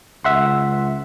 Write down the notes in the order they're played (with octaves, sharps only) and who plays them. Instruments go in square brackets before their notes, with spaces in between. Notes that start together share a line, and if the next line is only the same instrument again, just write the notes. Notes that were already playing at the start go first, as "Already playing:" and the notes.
[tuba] C#2 [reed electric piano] E5 F#5 C6